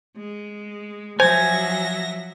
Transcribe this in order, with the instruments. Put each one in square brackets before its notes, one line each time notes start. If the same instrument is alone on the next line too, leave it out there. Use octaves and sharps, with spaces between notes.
[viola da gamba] G#3
[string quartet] F3 E5 A#6 [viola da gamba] F#3 [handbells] C5 [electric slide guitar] G#5